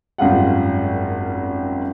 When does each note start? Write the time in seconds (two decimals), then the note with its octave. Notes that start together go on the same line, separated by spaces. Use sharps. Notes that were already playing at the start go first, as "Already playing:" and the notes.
0.18 G#1 F#2 G3 F4 F#5